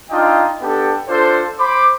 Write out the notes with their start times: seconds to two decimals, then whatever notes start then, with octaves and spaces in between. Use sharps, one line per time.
0.11 D4 D#4 F4 D#5 G5
0.61 B3 D4 G4 A4 G5
1.08 D4 F4 A4 C5
1.59 C5 B5 D6